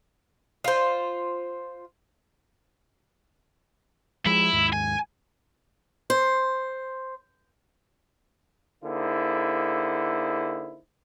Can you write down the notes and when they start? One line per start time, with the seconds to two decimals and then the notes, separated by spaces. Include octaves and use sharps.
0.64 F4 C5
4.26 F3 G#3 E4
4.53 D#2 G#2
4.73 G#5
6.10 C5
8.84 D3 A#3 D#4 E4 G#4 C5